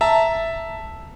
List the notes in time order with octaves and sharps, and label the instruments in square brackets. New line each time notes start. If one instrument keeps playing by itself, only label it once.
[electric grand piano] E5 A5 A#5